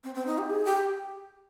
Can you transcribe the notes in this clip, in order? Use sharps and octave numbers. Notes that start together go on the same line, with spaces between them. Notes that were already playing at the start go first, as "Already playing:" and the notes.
C4
C4
D#4
G4
G#4
G4